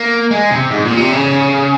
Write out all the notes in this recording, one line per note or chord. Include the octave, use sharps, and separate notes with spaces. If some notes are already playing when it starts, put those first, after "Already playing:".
Already playing: A#3
G#3
C3
G#2
A#2
C3
C#3